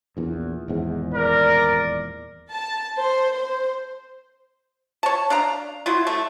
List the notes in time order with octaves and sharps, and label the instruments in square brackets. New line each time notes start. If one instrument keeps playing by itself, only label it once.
[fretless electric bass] A#1 E2
D#1 E2 G#2
[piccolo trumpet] A#4 [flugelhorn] D5
[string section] A5
C5
C5
[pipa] C#5 A5
D4 F5 A#5
F#3 E4 F4
A3